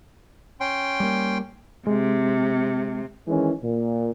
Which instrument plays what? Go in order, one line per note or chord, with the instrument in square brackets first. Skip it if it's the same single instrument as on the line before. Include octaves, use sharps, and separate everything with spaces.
[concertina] C#4 G5 C6
[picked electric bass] G3 A#3
[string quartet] C3 [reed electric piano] G#3
[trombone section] D#3 E3 G#3 C#4
A#2